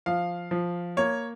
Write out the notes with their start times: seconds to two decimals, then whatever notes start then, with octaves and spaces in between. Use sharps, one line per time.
0.06 F3 F5
0.51 F3
0.97 A#3 C#5